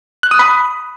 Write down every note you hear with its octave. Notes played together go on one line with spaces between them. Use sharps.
F#6
D#6
B5